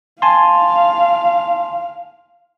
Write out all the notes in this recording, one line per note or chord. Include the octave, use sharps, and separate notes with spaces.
F5 G#5 A5 C6